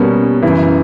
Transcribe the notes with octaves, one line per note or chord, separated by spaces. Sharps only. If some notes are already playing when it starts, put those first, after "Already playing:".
Already playing: B2 G3 A#3 C#4
F#2 C#3 E3